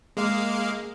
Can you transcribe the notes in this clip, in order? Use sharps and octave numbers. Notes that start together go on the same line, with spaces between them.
G#3 A#3 F5